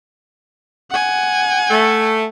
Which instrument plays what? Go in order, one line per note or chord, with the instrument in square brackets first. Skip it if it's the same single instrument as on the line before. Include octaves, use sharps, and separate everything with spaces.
[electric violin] F#5 G#5
[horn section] A3